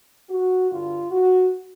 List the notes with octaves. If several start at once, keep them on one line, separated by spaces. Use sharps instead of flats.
F#4
G2 D3 F4
F#4